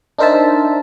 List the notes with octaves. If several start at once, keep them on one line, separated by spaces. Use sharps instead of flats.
D4 D#4 A#4 C5 E5 A5